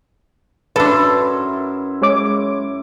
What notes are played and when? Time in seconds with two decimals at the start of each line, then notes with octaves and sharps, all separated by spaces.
0.76 F#2 D4 E4 A4 B4 C6
2.02 G#3 C#5 D6